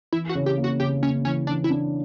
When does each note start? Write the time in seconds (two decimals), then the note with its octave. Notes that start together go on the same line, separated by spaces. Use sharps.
0.12 E3 E4
0.29 F#4
0.35 C#3
0.46 G4
0.58 A#3
0.64 F#4
0.80 C#3 G4
1.03 A#3 C#4
1.25 E3 C#4
1.47 E3 D4
1.64 E4
1.70 D4